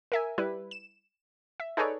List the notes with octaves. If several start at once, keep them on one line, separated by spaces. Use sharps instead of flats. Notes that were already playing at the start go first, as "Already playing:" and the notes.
A#4 E5 G#5
G3 E4 B4
E7
E5
D#4 G#4 A4 B4 C#5 D5